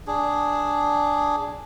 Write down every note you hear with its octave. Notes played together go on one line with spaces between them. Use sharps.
D4 G#4